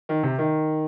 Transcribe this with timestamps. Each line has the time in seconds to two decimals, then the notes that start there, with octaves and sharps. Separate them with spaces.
0.09 D#3
0.23 C3
0.38 D#3